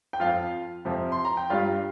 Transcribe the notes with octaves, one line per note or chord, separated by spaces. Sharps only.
G5
F2 F3 F4 F5
F2 C3 F3
C6
A#5
G5
G2 G3 F4 F5